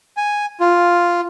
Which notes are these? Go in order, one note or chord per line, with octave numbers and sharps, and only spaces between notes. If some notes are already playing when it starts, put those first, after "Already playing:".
G#5
F4